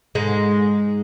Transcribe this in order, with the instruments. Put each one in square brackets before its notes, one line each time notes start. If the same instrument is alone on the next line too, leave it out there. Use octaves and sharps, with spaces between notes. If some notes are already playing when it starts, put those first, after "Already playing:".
[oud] G#2 G#3